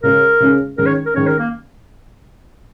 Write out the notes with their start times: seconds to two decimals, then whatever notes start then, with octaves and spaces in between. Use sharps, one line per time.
0.03 C#3 G#3 C#4 G#4 A#4
0.40 C#3 G#3 C#4 G#4
0.78 D#3 G#3 C#4 A#4
0.86 C#5
1.06 A#4
1.14 D#3 G#3 C#4 C#5
1.27 A#4
1.39 A#3